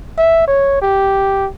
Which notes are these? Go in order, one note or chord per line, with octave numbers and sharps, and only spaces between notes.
E5
C#5
G4